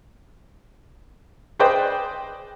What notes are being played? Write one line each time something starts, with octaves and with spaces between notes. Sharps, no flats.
G#4 B4 C5 D5 D#5 G5